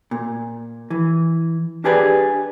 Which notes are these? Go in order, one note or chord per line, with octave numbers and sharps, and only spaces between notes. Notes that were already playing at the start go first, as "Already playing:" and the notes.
A#2
E3
D4 G4 G#4 B4 D5